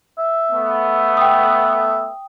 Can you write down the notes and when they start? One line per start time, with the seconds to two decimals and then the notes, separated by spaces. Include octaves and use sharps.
0.18 E5
0.51 A3 B3
1.17 G5 D#6